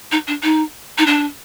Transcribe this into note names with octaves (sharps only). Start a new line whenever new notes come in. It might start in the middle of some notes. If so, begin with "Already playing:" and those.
D#4
D4
D#4
D#4
D4